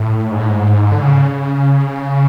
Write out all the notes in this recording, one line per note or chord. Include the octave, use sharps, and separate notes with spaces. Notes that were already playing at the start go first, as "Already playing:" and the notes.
Already playing: A2
G#2
A2
G#2
D3
C#3